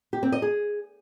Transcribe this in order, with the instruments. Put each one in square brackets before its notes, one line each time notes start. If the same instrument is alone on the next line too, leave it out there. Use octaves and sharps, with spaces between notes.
[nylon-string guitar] G4
C4
D#5
G#4